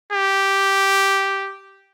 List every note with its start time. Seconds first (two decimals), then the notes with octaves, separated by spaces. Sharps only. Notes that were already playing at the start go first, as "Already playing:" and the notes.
0.12 G4